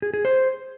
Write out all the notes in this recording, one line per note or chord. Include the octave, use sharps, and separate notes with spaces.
G#4
G#4
C5